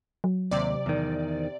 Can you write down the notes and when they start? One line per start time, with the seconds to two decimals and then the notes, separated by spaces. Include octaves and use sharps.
0.24 F#3
0.51 D#2 C3 D5
0.86 E2 D#3